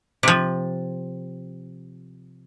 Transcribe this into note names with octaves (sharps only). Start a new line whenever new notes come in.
C3 F3